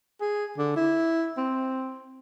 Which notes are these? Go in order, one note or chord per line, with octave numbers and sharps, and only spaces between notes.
G#4
D3
E4
C4